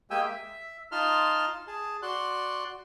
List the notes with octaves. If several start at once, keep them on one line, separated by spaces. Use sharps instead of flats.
G#3 A#3 G4 G5 G#5 E6
E5
D#4 F4 A5 C6 F6
G#4 A5
F#4 D5 C6 F#6